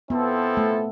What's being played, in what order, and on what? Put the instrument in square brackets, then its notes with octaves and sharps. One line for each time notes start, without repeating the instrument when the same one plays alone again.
[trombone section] F3 C4 E4 A4 [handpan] B3
[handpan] A3